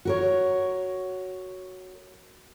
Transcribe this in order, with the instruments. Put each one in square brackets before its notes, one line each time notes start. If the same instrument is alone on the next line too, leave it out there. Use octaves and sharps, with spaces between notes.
[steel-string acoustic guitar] F#4 A#4 C#5